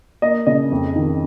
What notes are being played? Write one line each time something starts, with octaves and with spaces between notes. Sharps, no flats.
A#3 D#5
C#3 D#5
F2
D#3